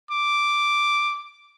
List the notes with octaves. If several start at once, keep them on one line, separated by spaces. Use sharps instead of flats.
D6